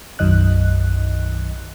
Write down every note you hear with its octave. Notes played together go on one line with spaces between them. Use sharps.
B1 F#2 D#3 D#5 F#6